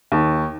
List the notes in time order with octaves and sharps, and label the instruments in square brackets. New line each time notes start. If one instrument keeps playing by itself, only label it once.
[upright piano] D#2